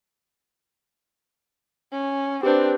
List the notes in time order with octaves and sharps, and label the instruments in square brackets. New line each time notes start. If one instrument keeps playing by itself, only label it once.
[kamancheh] C#4
[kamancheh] C4 D4 [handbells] G4 B4 C5